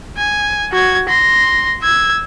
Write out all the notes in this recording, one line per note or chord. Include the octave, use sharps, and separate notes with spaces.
G#5
F#4 G#6
C6 A#6
E6 G#6